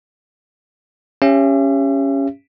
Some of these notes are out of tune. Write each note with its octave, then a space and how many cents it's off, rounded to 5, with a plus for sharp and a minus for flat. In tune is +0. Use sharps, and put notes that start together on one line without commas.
C#4 +0 G4 +30 E5 +40